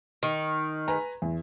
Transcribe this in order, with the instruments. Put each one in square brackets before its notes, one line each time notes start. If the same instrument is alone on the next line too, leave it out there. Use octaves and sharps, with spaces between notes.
[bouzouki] D#3
[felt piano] B4 G#5 A#5
E2